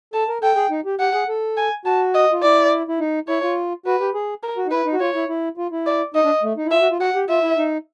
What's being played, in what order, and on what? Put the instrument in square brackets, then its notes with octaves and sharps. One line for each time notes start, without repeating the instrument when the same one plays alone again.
[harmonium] A4 [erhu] A5
[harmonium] A#4
[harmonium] A4 [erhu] G5
[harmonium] G#4
D#4
G4
[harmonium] G4 [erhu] F#5
[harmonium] G#4
A4
[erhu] G#5
[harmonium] F#4 [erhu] A5
[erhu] D#5
[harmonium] F4
[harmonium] E4 [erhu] D5
[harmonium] E4
D#4
[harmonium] E4 [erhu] C#5
[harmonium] F4
[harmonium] F#4 [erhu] B4
[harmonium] G4
G#4
[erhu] A#4
[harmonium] F#4
D#4
[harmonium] E4 [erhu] B4
[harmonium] D#4
F#4
[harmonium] F4 [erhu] C#5
[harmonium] E4
E4
F4
E4
[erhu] D5
[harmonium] D#4 [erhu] D#5
[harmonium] D4
A3
D#4
E4
[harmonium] F4 [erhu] E5
[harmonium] F#4
F4
[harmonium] F#4 [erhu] F#5
[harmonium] G4
[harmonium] F4 [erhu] E5
[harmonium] E4
D#4